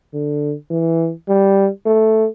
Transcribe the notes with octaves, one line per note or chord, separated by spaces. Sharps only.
D3
E3
G3
A3